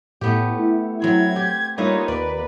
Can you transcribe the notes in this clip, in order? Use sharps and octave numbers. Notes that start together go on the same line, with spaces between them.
A2 A3 B3 G4
E4
F#3 C4 G#6
G4
G3 A#3 D#4 F4 B4 C#5 E5
D#2 B4 D5